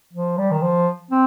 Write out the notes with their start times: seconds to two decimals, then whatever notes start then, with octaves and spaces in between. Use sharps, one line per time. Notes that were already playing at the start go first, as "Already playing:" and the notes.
0.13 F3
0.38 G3
0.51 D#3
0.62 F3
1.11 C4